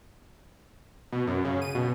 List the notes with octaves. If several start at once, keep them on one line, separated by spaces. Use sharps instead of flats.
B2
F#2
C#3
D#7
B2